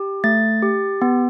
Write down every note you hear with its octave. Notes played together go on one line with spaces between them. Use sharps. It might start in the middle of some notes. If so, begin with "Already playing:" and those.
Already playing: G4
A3 A6
G4
B3